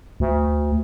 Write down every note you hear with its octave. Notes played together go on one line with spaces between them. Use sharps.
D2